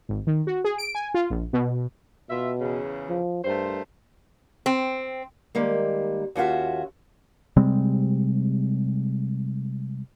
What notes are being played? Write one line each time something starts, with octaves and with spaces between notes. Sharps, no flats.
G#1
D#3
F#4
G#4
D7
G#5
F4
A#1
B2
B2 F4 E5
E2 C#3
F3
G2 A3 A#4 C5
C4
D#3 G3 G#3 A#3
D#2 C#4 F4 F#4 E5
C3 G3 G#3 C4